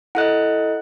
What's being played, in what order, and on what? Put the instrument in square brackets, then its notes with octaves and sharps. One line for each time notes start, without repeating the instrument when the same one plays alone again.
[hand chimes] E4 A4 D#5 [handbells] F#5 F#6